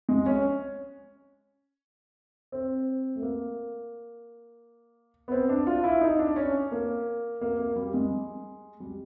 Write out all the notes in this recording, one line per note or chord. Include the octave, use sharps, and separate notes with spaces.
G#3
C#4
C4
A3
A#3
B3
C4
D4
F4
E4
D#4
D4
C#4
A#3
A#3
A#3
G3
G#3
G3